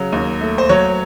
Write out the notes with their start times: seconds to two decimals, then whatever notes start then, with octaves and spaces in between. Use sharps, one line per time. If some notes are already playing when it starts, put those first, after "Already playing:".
Already playing: C#3 F#3
0.12 D#2
0.41 A3
0.58 C5
0.69 F#3 C#5